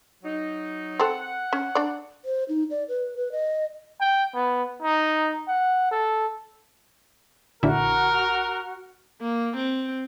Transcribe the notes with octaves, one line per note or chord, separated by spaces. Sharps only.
F#3 D#4
C4 A4 F#5
C#4
D4 D5
C5
D#4
D5
B4
B4
D#5
G5
B3
D#4
F#5
A4
A#1 D3 E4 F#4 A#4 F#5
A#3
C4